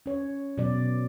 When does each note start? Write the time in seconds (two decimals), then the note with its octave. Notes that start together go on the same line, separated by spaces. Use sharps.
0.06 C#4 C#5
0.58 B2 F#3 D5